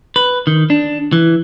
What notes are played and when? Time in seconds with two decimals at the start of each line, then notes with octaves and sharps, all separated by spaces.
0.16 B4
0.47 D#3
0.70 D4
1.13 E3